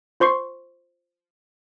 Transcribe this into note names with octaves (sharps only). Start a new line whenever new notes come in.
F4 C5 C6 C#6 C7